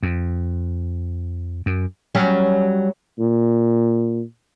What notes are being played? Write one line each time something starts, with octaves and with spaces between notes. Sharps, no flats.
F2
F#2
F#3 G3 C#4
A#2